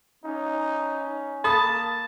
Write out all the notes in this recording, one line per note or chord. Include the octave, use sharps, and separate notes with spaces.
C#4 D#4
A#3 A5 B5 D#6